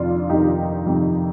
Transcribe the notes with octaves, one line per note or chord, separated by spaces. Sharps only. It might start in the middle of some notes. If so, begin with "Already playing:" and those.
Already playing: F2 C3 D#3 D4 F4
F2 C3 D#3 D#4 G4
F2 C3 D#3